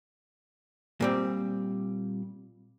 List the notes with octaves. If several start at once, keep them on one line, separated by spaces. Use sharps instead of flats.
A#2 G3 C4